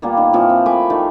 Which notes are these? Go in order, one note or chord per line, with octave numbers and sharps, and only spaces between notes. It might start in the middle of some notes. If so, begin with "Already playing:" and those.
A#2 G3 A#3 B3
D#3
A#2 E3 F3 C4
C4
A3 G#5 B5 D6
D#3 A3 G4